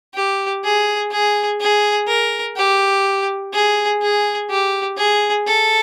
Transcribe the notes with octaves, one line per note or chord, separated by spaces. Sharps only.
G4
G#4
G#4
G#4
A#4
G4
G#4
G#4
G4
G#4
A4